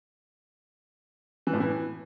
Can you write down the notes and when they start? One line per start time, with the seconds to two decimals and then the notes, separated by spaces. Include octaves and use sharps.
1.47 E3
1.53 A2
1.60 E3